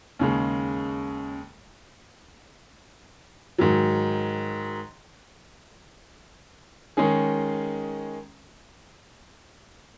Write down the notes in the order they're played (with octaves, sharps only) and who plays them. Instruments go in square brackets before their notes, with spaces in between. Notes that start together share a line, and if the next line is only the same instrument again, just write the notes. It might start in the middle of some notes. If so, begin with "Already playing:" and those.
[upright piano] D#2 C#3 G#3
G#2 D#3 F#3
D#3 G#3 C#4 G#4